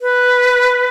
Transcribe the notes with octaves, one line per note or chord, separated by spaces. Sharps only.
B4